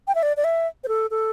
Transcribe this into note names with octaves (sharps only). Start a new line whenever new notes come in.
G5
E5
D5
D5
E5
C5
A4
A4